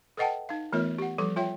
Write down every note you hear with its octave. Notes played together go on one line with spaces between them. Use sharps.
A4 B4 D#5 F#5 G5 A5
D#4 F5
E3 A3 B3 F4 A#4 C#5
G4 F#5
F3 G3 A4 D6
F4 C#5 E5 G5